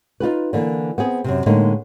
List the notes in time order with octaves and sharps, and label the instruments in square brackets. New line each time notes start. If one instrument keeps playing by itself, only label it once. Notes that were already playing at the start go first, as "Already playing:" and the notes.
[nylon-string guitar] D#4 F4 G4 B4
D3 E3 A#3
B3 C4 G#4
F#2 C3
A2 D3 G#3 A#3 D#4